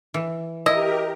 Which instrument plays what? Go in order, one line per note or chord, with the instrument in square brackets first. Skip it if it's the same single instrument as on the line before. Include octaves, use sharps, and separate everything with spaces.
[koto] E3
[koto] E4 [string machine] G4 A#4 [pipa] D#5